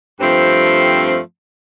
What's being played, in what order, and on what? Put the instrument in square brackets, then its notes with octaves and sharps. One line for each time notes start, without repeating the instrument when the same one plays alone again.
[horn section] G2 F3 A3 C4